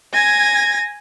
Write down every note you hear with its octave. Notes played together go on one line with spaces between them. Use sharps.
G#5 G#6 A#6